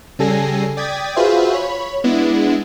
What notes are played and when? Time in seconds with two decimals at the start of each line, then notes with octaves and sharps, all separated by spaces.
0.19 C#3 G3 A4 G#5 A#6 C7
0.77 D5 G5 D#6 G#6 A6 B6
1.16 F4 F#4 G#4 B4 C5 E5
1.54 C#5 B5
2.04 G#3 B3 D4 E4